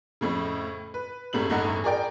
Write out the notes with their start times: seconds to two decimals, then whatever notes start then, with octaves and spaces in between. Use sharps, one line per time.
0.21 F2 A2 C#3
0.94 B4
1.33 G1 A2 C#3 G3 F#7
1.50 G1 E2 A2 D#4 F#5
1.84 G#4 A#4 D5 G5